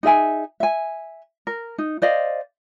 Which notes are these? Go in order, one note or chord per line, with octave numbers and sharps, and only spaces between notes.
D#4 G#4 E5 G#5
E5 G#5
A#4
D#4
C5 D5 D#5 F5